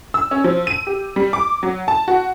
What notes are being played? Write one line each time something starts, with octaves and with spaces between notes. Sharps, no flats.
E6
C#4
F3
D#7
G4
G3
D6
F#3
A5
F#4